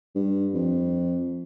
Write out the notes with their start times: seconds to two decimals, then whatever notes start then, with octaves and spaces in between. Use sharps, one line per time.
0.15 G2
0.54 F2